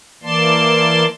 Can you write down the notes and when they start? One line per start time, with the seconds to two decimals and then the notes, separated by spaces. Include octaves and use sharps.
0.23 E3 A#3 D5 A5 C6